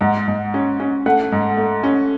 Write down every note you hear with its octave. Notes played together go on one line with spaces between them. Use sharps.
G#2 F#5
G#2
C#4
C#4
A3 F#5
G#2
A3
C#4